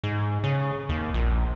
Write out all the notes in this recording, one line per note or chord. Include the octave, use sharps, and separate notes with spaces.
G#2
C#3
D#2
A#1